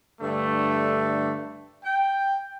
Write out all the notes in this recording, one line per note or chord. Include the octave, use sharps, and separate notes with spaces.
G2 D3 A3
G5